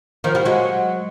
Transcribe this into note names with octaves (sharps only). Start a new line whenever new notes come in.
D#3 F3
F3 G3
F#3 G#3